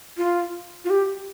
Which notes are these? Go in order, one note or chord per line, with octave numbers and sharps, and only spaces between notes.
F4
F4
G4